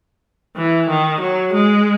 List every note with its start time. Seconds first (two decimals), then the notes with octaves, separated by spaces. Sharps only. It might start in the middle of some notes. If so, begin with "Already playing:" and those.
0.56 E3
0.89 D#3
1.21 F#3
1.54 G#3